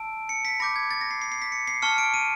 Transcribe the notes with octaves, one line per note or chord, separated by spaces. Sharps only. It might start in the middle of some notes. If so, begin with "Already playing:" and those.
Already playing: A5 E6 D7
C#7
B6
B5 D6 G6 A#6
G#6
A6
A#6
C7
C7
C7
B6
C#7
C7
A5 C#6 F6 C#7
D7
D#7